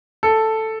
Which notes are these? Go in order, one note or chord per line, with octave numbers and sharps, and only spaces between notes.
A4